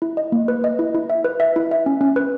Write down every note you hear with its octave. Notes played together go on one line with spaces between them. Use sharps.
E4
D#5
A#3
B4
D#5
E4
E4
E5
B4
E5
E4
E5
C#4
C#4
B4